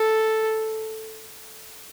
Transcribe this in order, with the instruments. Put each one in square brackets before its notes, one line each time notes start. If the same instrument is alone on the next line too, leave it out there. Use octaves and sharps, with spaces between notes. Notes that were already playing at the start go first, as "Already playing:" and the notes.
Already playing: [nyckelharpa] A4